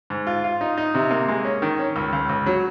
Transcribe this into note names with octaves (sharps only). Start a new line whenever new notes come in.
G#2
F4
F4
D#4
D#4
C3
A#3
G#3
C#4
D#3
C#4
C#2
C#2
C#2
F#3